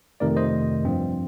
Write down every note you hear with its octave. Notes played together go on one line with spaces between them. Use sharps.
F2 C3 D#3 A3 A#4 D5
C5 D#5
G2 F3 C4